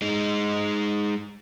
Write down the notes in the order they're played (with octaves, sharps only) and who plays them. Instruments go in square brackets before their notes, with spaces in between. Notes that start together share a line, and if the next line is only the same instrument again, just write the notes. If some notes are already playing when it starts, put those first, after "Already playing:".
[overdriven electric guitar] G#3 D#4